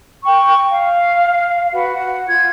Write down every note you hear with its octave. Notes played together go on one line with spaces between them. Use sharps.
G5 C#6
F5
F#4 B4 F#5
F#5
F4 G#6